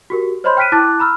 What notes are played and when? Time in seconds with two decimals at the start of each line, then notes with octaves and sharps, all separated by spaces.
0.10 F#4 G4 A#4
0.44 C5 C#5 D#5 B5 C6 G6
0.57 G5 F6 F#6 B6 D7 D#7
0.72 E4 A5 D6 F#6 A6
0.99 A#5 B5 E6 F6